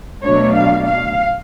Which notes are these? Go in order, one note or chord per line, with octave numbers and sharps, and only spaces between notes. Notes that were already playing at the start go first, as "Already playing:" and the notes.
B2 F#3 A3 D4 C#5
F5
F5